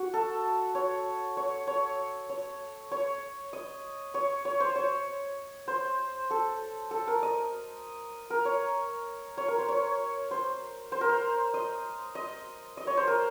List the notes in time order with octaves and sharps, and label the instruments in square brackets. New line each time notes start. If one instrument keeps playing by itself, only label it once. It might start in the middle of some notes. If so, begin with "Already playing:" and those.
Already playing: [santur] F#4
A4
C#5
C#5
C#5
C#5
C#5
D#5
C#5
C#5
C5
C#5
C5
A4
A4
A#4
D#5
A#4
C#5
C#5
A#4
C5
C#5
C5
C5
A#4
C5
D#5
D#5
D#5
C#5
C5
A#4